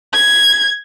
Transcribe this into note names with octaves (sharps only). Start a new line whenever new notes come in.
G#6